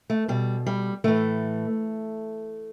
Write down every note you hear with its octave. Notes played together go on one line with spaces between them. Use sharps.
A3
B2 G3
G3
A2 E3 A3